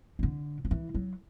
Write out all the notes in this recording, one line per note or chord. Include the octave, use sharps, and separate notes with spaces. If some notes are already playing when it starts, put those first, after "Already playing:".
C#3
D3
F3
E3
F#3